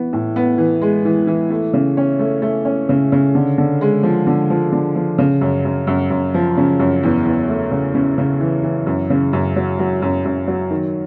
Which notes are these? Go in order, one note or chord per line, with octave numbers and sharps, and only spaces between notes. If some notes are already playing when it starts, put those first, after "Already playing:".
Already playing: E3 B3
A2
B3
E3
G#3
E3
E3
A3
C#3
C#4
A3
A3
C#4
C#3
C#3
D3
D3
G#3
F3
D3
F3
D3
F3
C#3
F#2
F#2
F#2
F#2
F3
C#3
F#2
E2
E2
A3
C#3
C#3
C#3
E3
E3
F#2
C#3
F#2
F#3
F#3
F#2
F#2
F#3
D#3